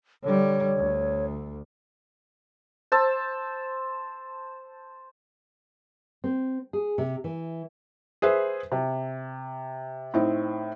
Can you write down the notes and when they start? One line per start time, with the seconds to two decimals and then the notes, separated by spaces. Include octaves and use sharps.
0.23 D3 G3 C#5
0.76 D2
2.92 C5 A5 E6
6.24 C4
6.73 G#4
6.98 C3
7.24 E3
8.22 G#4 B4 C5 E5
8.72 C3
10.14 A2 C4 D#4